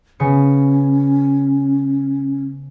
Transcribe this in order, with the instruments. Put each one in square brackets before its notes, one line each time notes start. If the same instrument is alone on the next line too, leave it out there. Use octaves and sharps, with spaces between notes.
[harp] C#3 B3 C#7 [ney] C#4